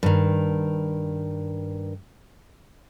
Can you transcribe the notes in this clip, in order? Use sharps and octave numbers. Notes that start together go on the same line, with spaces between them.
G2 D#3